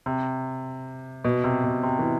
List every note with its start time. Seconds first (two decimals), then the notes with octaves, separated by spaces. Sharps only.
0.06 C3
1.24 B2
1.44 C3
1.64 B2
1.83 C3
1.99 E3